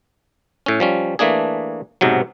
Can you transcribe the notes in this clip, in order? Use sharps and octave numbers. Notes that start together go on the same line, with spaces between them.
A2 C#4
F3 G3 C#4
E3 A3 A#3 D4 G#4
B1 G#2 C3 F#3